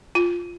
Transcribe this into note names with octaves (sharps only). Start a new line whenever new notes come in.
F4